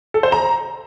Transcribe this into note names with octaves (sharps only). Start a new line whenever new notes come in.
A4
C5
A#5